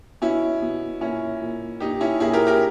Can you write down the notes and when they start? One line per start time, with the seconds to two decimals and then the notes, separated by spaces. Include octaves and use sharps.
0.22 B2 C#4 E4
0.62 B2
1.01 A#2 C#4 E4
1.42 A#2
1.80 A#2 D#4 G4
2.01 C#4 E4
2.20 A#2 E4 G#4
2.33 G4 A#4
2.47 G4 A#4